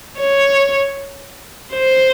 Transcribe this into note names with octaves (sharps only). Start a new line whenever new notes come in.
C#5
C5